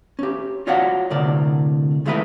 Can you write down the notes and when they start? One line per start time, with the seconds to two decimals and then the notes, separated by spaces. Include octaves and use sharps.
0.19 C#4 G4
0.67 F4 F#4 C#5 D5 F5 F#5
1.11 D2 A2 C3 A#4 D5
2.06 D#3 G#3 A3 E4 A4 B4